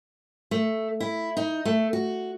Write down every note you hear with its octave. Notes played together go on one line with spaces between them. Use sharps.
A3
E4
D#4
A3
F#4